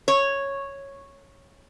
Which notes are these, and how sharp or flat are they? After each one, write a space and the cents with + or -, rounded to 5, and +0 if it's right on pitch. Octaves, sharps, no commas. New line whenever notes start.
C#5 -5